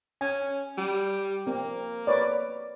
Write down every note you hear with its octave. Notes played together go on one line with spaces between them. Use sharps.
C#4 G#5
G3
A#3 C4
B4 C#5 D5